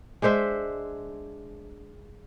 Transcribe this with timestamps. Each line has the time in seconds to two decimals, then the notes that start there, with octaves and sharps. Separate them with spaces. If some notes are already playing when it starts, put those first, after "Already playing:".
0.22 G#3 D4 C5 E5